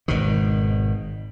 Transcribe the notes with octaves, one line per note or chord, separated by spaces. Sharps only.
G#1 B2 D#3